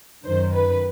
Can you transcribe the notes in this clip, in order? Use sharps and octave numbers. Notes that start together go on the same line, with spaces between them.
F#2 D#3 C5
B4